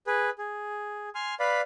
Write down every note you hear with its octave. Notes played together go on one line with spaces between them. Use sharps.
G#4 B4
G#4
G#5 C6 F6
B4 D5 F5 B5